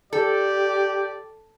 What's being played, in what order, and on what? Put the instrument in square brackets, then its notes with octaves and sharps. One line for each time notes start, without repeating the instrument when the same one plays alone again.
[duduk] G4 [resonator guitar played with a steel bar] A4 [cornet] D5